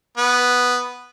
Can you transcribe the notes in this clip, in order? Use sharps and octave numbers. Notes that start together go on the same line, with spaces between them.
B3